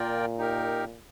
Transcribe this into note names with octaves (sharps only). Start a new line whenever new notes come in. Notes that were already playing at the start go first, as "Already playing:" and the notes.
Already playing: A#2 F4 A#4 D5 G5
D#4 G4 A#4